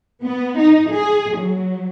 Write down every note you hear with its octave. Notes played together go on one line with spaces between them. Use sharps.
B3
D#4
G#4
F#3